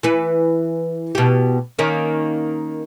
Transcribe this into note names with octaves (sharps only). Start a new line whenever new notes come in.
E3 B4
B2 G4
D#3 A#3 C#4